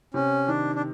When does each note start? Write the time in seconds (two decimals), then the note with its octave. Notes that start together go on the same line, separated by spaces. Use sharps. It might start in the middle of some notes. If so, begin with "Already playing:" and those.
0.14 C3 C#4
0.48 D#3 D4
0.75 D4